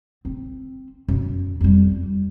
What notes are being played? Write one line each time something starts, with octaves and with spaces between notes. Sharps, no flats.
C4
F#2
F2 G3